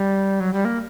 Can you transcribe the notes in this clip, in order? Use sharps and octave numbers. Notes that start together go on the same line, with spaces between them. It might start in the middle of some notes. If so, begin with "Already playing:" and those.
Already playing: G3
F#3
G3
A#3